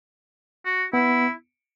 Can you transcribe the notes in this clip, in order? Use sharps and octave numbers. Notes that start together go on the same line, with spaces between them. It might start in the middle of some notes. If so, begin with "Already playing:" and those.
F#4
B3 E4